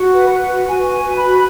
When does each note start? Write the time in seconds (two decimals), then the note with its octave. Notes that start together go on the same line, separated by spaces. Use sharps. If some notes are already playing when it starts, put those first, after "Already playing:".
Already playing: F#4 F#5
0.11 B4
0.30 B4
0.49 F#4
0.68 F#4 G#5
0.86 B4
0.92 G#5
1.05 B4
1.17 B5
1.24 F#4